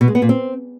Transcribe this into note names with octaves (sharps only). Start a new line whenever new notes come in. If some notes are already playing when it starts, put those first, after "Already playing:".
B2
G#3
B3
A#2
C4